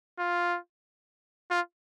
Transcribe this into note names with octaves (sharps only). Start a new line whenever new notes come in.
F4
F4